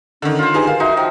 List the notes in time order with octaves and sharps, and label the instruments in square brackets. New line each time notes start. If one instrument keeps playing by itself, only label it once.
[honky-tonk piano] D3 D#3 [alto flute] C#4
[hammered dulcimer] F4 C5
[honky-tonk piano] D#4 G4 G#4 [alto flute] B4
[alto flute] A#4 [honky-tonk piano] F5
[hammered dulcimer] D#4 [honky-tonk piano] F#4 [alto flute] E5
[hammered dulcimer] F3 [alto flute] G5